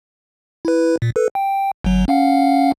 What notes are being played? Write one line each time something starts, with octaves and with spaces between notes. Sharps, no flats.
E4 B4
A#2
A4 B4
G5
G1 F#3
C#4 F5 F#5